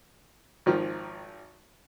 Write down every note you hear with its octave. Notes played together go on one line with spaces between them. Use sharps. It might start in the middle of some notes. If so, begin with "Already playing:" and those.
G#1 D#3 F3